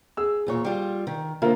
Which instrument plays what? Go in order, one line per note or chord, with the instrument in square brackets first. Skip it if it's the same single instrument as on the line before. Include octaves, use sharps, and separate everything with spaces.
[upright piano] G#4 E6
[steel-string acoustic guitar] E2 A#2 C#5
G3 F4
D#3
[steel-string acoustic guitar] D3 C5 [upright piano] A#3 F4 A#4